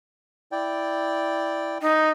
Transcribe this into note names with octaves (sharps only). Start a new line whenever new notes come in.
E4 D5 G5
D#4